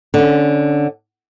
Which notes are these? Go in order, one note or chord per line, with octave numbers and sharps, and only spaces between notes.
D3 C#4